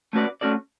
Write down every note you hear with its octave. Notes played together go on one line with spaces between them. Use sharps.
A3 C#4 F#4 B4 D5
A3 C#4 F#4 A4 D5